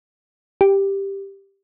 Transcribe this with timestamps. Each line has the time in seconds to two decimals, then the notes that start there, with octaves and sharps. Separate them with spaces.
0.61 G4